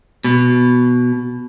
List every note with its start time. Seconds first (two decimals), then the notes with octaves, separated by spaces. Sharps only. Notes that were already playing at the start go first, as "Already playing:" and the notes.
0.24 B2